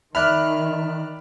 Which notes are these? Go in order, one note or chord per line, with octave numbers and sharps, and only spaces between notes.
D#3 D5 E5 B5 F6 F#6